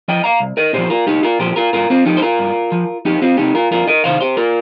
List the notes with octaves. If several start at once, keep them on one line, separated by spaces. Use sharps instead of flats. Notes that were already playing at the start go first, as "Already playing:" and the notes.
F3 D#5 G5
F5 A#5
C2
A#4 D#5
A#2 F3 G4 C5
F4 A#4
C2 D#4 G4
F4 A#4
A#2 F3 G4 C5
F4 A#4
G2 F4 A#4
C4 F4
F3 D#4 G4
C5
F4 A#4
G2
F3
F2 D#4 G4
C4 F4
C3 D#3 D#4 G4
F4 A#4
F2 F4 A#4
A#4 D#5
C3 D#3 C5 F5
G4 C5
F4 A#4